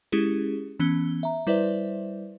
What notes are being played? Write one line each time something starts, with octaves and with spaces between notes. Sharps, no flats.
G#3 C#4 E4 G4 G#4
E3 B3 C#4 G7
E5 A#5
G3 E4 B4 C5 D5 E5